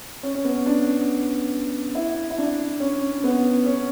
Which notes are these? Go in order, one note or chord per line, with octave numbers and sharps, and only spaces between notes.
C#4
C#4
B3
D4
E4
E4
D4
C#4
B3
C#4